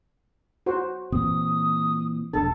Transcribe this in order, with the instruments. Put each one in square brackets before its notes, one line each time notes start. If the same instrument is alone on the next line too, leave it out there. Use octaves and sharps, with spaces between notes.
[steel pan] F#4 C5
[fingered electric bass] A#2 E3 C4 [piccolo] D#6
[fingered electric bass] E1 A#1 D4 [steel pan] A4 [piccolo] A6